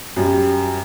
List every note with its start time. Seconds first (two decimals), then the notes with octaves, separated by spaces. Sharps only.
0.16 F#2 G3